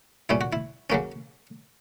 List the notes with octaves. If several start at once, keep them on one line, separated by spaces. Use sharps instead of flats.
A#2 G3 C#4 E4
F#4
E4
C#3 F#3 A#3 C#4